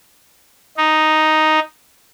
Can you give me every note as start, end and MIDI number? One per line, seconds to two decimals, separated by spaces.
0.77 1.59 63